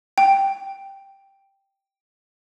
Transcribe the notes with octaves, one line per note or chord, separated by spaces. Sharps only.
G5